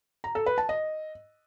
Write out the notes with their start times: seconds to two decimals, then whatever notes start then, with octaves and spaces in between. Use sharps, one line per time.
0.24 A#5
0.35 A4
0.46 B4
0.58 A5
0.69 D#5